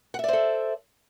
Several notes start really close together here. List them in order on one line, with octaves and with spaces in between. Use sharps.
F#5 E5 D5 C5 A4